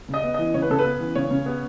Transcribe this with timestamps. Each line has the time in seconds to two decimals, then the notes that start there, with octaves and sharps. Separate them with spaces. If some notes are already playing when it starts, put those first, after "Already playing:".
0.08 C#3
0.14 D#5
0.24 B3
0.34 E3 D#5
0.54 C#3 C#5
0.62 B4
0.70 C#3 A4
0.79 B4
0.85 B3
1.00 E3
1.15 C#3 C#5
1.31 C#3
1.46 B3